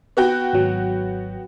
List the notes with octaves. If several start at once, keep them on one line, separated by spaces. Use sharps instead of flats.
B3 F#4 G5
G#1 F#3